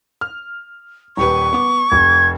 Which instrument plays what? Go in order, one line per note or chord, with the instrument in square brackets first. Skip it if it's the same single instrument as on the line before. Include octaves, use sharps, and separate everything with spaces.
[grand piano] F6
[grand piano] D#1 G4 B4 [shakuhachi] C#6
[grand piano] B3 D6
[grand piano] F1 [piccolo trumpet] G#6